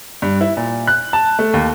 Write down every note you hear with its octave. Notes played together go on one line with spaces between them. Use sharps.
G2
E4
A#2
F#6
A5
A3
D#2